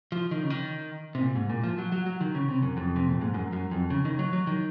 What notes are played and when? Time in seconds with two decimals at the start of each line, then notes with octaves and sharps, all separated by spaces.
0.12 F3
0.31 D#3
0.43 C#3
0.50 D#3
1.15 C3
1.21 A#2
1.35 G#2
1.50 A#2
1.64 F3
1.78 F#3
1.92 F#3
2.06 F#3
2.21 D#3
2.35 C#3
2.48 C3
2.62 F#2
2.77 F2
2.96 C3
3.08 A#2
3.21 G#2
3.34 F#2
3.53 F#2
3.71 F2
3.90 C#3
4.05 D#3
4.19 F#3
4.33 F#3
4.47 D#3